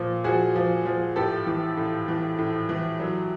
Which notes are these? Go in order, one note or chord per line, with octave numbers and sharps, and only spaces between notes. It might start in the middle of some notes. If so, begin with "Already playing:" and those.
Already playing: A#2 F3
F3 F#4 G#4
F3
F3
A2 G4 A4
E3
A2
E3
A2
E3
F#3